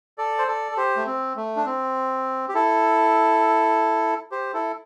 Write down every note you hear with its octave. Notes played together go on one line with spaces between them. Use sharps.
A4 D5
C5
A4 D5
A4
G4 C5
A3
C4
A3
D4
C4
G4
E4 A4
G4 C5
E4 A4